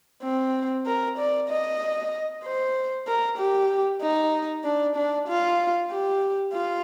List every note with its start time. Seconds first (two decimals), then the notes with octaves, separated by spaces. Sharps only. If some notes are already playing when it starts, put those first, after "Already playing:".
0.23 C4
0.86 A#4
1.18 D5
1.49 D#5
2.44 C5
3.07 A#4
3.38 G4
4.02 D#4
4.64 D4
4.96 D4
5.28 F4
5.91 G4
6.53 F4